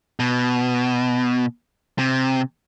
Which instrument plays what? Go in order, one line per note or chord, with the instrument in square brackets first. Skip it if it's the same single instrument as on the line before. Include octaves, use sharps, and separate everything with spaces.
[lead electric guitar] B2
C3